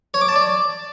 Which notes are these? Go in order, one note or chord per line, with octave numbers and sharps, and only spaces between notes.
C#5
D6
A5
D5